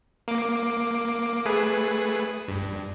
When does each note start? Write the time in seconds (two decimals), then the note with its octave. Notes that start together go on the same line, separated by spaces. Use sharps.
0.28 A#3 D6
1.46 A3 G#4 B4
2.48 G2